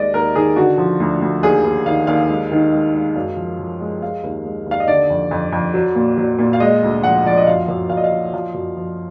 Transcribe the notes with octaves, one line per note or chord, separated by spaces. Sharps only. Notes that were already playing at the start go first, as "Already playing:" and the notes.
Already playing: D#2 G#3 D5 D#5
D#2 A#4
D#3 G#4
D3 F#4
F3
D2
D2
D#2 G#4
D#2
D#3 F5
D#2 F5
G#3
D#3
G#3
G#3
F#2
F3
F3
G#3
G#3 F5
D#2
G#3
D#2
F5
D#5
D3 D5
F2
F2
F2
F#3
A#2
F#3
A#2
F5
G#3 D#5
D2
F3 F#5
F3 D5
D#5
F#2 F5
F#2
F#2 F5
D#5
F5
F#3
F3 F5
F#2
F3